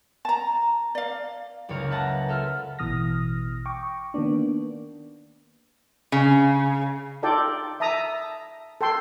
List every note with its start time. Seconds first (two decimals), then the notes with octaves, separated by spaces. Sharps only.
0.25 A5 A#5
0.95 D5 F5
1.69 F#1 C#2 C#3 C#5 F5 A#5
1.90 B4 E5 F#5 A5 A#5
2.28 F4 A4 E5 F6
2.79 A1 B2 E3 D#6 F6 A#6
3.66 G5 C#6 D6
4.14 D#3 A#3 B3 D4
6.12 C#3
7.23 D#4 F4 A4 D5 G5
7.80 E5 A5 A#5 D#6
8.81 A4 G5 C6